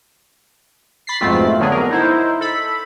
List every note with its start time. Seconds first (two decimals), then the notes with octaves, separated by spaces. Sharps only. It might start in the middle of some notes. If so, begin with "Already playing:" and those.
1.07 B5 A6 B6 C7
1.21 F2 G#2 B2 A3 C4 F4
1.60 D3 F#3 B3 D4 G#4
1.71 A#4
1.90 D#4 E4 C5
2.41 A4 B5